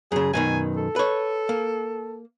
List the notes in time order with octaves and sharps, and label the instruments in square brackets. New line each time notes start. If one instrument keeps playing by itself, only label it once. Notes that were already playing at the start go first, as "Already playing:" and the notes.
[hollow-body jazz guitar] F#2 C#3 [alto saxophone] G#4
[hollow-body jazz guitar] F#2 B2 D#3 [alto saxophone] G#5
[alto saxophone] A4
[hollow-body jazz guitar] B4 C#5
A#3